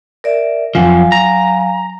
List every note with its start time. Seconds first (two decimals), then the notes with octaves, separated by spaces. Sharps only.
0.24 A#4 D5 E5
0.75 F2 F3 F#3 F5 G#5
1.12 A#5